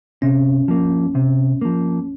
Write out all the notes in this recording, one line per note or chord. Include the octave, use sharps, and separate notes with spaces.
C3 C#4
F3 A#3
C3
F3 A#3